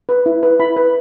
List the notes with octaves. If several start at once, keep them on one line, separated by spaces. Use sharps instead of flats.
B4
E4
B4
E4 B5
B4